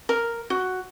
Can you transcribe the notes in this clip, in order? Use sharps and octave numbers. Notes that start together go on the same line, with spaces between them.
A#4
F#4